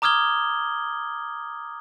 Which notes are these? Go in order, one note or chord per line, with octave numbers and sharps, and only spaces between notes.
A#5 D6 D#6 F6 G#6 G7